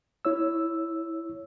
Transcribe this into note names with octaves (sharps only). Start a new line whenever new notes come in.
E4 C#5 E6